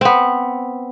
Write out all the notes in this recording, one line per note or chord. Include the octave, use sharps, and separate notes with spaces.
B3 C4